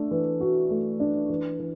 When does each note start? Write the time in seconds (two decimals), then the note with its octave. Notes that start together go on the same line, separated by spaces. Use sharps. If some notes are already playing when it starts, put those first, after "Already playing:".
Already playing: A3 D4
0.11 E3
0.40 F#4
0.71 A3
1.00 D4
1.30 E3
1.60 E3